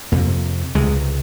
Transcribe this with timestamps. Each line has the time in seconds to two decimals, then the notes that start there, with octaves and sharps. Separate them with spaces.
0.12 F2 C3 A#3
0.75 C#2 C3 G#3